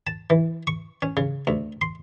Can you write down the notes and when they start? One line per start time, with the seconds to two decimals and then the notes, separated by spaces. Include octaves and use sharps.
0.07 A5
0.30 E3
0.67 C#6
1.02 C#4
1.17 C#3
1.47 D2
1.81 C6